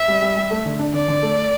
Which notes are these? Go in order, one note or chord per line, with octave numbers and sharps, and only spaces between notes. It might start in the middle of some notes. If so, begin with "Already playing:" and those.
Already playing: E5
G3
G3
G3
A3
D3
D4
D3 D5
D3
A3